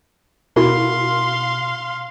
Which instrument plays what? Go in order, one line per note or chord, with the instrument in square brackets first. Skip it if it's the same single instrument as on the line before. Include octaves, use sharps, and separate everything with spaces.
[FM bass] B2 [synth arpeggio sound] E4 F#4 A#4 [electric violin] F5 C6